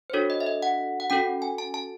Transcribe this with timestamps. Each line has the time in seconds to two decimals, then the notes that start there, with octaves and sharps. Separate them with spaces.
0.10 C5
0.13 D4 F#4 A4 C#5
0.30 D#5
0.40 E5
0.47 D#5
0.62 F#5
1.00 F#5
1.10 C#4 F#4 A4 G5
1.42 G#5
1.58 A5
1.74 A5